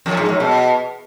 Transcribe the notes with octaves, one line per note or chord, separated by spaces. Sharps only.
F2
G#2
F#2
B2